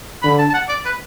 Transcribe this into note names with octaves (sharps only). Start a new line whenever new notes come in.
D3 B5
A5
A5
F#5
D5
B4